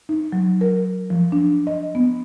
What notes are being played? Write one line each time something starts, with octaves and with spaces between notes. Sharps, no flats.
D#4
F#3
A#4
F3
D4
D#5
B3